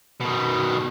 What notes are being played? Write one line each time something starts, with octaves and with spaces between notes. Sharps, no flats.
B2 D#3